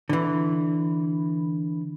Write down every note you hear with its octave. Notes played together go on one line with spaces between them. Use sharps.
D3 E3